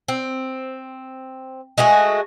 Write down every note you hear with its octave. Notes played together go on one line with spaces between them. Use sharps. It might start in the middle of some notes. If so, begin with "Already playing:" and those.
C4
G#3 A3 F#4 G#4